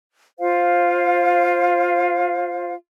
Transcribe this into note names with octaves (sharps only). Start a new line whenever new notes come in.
F4 C5 F5